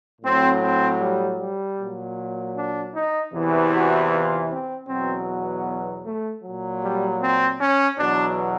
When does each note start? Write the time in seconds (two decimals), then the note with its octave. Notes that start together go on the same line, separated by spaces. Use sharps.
0.22 A2 F#3 C4
0.61 C4
1.00 G3
1.38 G3
1.78 A#2 F#3
2.56 D4
2.94 D#4
3.33 E2 C3 E3
3.72 F#4
4.10 F4
4.50 C4
4.88 E2 B2 F#3 C4
5.26 B3
6.05 A3
6.44 A#2 F#3
6.82 G3
7.21 C4
7.61 C#4
7.99 E2 B2 F#3 D4